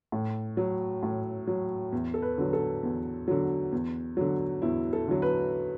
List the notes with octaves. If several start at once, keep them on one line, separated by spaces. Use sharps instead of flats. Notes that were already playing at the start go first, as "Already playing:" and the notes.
A2
F#3
A2
F#3
E2
A4
B4
D3 F#3
A4
E2
D3 F#3
E2
D3 F#3
E2 E4
A4
D3 F#3
B4